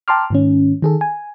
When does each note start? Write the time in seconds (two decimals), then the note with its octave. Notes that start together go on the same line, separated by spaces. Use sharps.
0.08 G5 A5 A#5 C6 D6 F6
0.30 G#2 D#3 C#4
0.82 D#3 G#4 A4
1.01 G#5